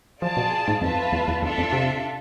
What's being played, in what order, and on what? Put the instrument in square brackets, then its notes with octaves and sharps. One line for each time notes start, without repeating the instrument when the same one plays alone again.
[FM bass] F3 [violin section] F4 G#4 D5 A5
[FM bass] B2
G#2
[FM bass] F2 [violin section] F4 B4 E5 A5
[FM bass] E2
E2
[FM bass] E2 [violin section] D4 F4 A4 E5
[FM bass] F2
C3